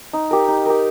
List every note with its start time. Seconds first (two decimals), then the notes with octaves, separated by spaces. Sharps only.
0.13 D#4
0.31 G4 A#4
0.48 D#4
0.66 G4 A#4